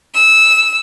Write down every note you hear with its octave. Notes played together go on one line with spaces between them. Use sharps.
E6